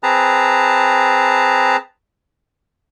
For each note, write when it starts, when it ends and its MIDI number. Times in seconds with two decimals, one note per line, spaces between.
0.03 1.77 60
0.03 1.77 68
0.03 1.77 71
0.03 1.77 81
0.03 1.77 82